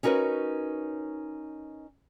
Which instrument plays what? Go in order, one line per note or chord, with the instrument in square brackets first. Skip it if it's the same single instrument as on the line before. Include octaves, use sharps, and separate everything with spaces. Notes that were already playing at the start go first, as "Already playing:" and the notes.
[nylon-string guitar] C#4 D#4 F#4 A#4 B4 C#5